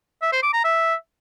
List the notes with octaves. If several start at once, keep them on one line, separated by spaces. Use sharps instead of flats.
E5
C5
D6
A#5
E5